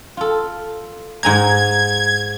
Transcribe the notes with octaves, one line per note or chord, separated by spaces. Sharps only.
F4 A4
G#2 G#5 A#5 G#6